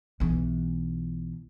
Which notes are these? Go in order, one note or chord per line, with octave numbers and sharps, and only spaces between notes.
B1 E3